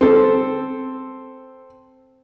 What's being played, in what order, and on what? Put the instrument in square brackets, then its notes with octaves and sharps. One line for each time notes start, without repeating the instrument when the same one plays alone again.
[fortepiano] C4 A4